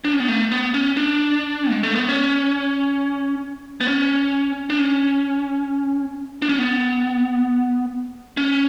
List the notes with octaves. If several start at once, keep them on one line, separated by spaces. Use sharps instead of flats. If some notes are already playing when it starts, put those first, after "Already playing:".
D4
C#4
B3
A3
B3
C#4
D4
G#3
A3
B3
C#4
B3
C#4
D4
C#4
D4
C#4
B3
C#4